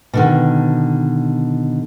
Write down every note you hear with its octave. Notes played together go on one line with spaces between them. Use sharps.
B2 D3 D#3